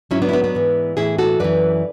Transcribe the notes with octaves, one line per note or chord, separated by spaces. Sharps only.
G#2 F#3 C#4 E4
B3 D4
E4
B3 D4
B3 D4
G#2 E3
A2 E3 E4 G#4
F#4 A4
F#2 E3 B4 D5